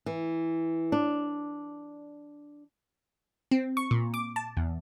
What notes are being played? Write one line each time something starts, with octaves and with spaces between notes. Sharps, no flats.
E3
D4
C4
C#6
A#2
D6
A5
E2